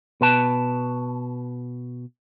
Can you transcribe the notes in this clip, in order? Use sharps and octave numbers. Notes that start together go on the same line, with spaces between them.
B2 B4 A5